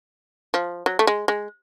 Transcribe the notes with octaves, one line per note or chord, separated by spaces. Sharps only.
F3
F#3
A3
G#3
G#3